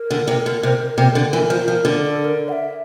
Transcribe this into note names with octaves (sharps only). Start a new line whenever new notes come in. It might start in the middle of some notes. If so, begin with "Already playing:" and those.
Already playing: A#4
D3
C3
D3
C3
C3
D3
E3 A#4
F3
F3
D3
A4
A#4
F#5
E5